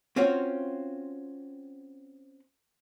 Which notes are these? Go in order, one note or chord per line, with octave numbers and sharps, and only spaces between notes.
C4 C#4 F4 F#4 C#5